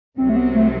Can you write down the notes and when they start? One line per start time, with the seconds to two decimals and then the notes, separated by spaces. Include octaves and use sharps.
0.18 C2 C3 F#3 C4
0.29 A3
0.36 B3
0.55 A3